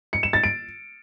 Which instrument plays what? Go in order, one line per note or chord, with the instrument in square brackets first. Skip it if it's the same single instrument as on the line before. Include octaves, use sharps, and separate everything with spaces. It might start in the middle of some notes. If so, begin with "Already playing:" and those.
[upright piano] C#7
E7
A6
D7